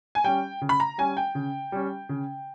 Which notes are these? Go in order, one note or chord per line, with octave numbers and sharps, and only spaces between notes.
G#5
G3 C#4 G5
C#3
B5
A#5
G3 C#4 G#5
G5
C#3
G3 C#4
C#3